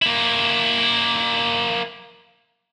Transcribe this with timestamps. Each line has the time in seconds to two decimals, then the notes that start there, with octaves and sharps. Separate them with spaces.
0.02 A#3 E4